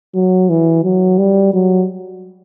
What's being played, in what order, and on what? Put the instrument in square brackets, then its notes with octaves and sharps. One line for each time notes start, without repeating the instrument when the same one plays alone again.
[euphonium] F#3
E3
F#3
G3
F#3